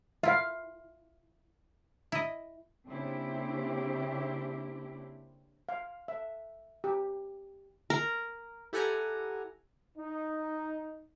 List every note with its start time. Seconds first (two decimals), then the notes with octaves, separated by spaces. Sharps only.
0.23 E4 F4 E5 F5
2.12 E4 D#5
2.88 C#3 A#3 C4 D4 E4 G4
5.69 F5
6.08 E5
6.84 G4
7.90 A#4
8.73 E4 G4 A4 F#5 G#5 A#5
9.98 D#4